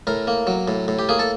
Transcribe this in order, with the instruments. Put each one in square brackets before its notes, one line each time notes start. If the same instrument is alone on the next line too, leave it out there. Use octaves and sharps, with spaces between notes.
[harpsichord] A2 A#4
A#3
F#3
A2
A2
G4
A#3 G#4
A4